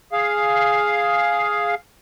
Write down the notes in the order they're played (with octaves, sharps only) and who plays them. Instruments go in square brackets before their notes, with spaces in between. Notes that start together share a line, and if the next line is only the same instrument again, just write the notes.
[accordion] G#4 F5